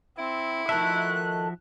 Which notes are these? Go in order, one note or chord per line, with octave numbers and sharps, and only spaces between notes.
C4 E4
D#3 F3 A3 F#4 E5 F#6